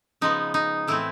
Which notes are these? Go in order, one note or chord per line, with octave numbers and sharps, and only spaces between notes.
C#3 F3 G#3 B3 D#4
D#4
A2 E3 A3 C4 E4